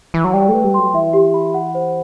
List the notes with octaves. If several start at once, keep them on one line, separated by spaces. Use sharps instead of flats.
E3
F#3
G3 G5
A3 B4
G3
F#3 C6
E3 E5
G4
B5
F#5
C5